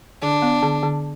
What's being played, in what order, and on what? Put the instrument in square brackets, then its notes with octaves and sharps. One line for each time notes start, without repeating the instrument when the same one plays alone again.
[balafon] D3 [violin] D4
[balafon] B3
D3
D3